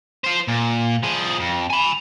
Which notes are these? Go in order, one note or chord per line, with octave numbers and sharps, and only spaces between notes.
F4 C5
A#2
F3 G#4
F2
G#5 B5